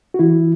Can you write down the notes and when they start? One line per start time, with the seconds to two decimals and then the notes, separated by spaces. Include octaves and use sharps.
0.14 F#4
0.19 E3 E4